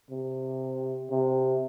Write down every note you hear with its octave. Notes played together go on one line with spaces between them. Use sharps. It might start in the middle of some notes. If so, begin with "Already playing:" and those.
C3
C3